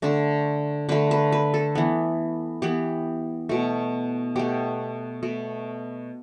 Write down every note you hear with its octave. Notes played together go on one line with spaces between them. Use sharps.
D3 A3 D4
D3 A3 B4
B4
B4
A4
E3 B3
E3 B3 G4
B2 A3
B2 A3 G4
B2 A3